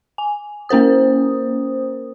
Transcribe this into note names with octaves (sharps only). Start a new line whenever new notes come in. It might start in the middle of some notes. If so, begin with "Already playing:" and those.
G#5
A#3 C#4 A#4 C5 D#6